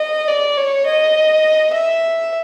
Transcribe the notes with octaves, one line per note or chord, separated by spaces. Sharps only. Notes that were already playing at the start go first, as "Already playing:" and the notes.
Already playing: D#5
D5
C#5
D#5
E5